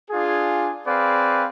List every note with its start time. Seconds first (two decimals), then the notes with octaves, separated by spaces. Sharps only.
0.10 D4 F4 G#4
0.86 C4 G#4 B4 D5 F5